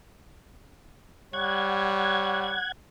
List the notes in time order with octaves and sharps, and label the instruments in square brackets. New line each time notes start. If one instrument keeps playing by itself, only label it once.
[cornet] G3 [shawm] C#5 [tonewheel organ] F#5 G#6